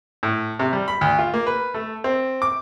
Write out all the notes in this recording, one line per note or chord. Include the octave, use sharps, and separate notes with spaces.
A2
C3
G3
B5
D2
F4
A#3
B4
A3
C4
D6